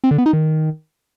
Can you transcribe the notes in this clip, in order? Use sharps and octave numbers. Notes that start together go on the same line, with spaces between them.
C4
D3
B3
D#4
D#3